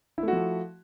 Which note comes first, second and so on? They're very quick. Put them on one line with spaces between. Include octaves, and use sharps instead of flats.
E4 A3 F#4 F3